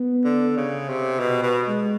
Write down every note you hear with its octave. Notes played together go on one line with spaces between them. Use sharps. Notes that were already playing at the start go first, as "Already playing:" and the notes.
Already playing: B3
D3
C#3
C3
B2
B2
G#3